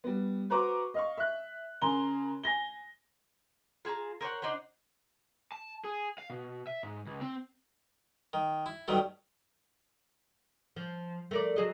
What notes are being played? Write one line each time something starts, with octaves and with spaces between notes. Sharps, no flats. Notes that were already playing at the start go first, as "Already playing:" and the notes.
G3 B3
F#4 B4 C5 A#5 C#6 D6
D#5 F5 C#6
E5 F#6
C#3 A#4 G#5 A#5 C6 G7
G#5 A#6 G7
F4 G#4 A5 A#5
A#4 C5 C#5 F#5
D4 D#4 C5 F#5
A5
G#4
F5
B2
E5
G#2
C#2
C4
D#3
E4
G2 D#3 F#3 G3 A3
F3
A3 A#4 D5
F#3 G#4 D#5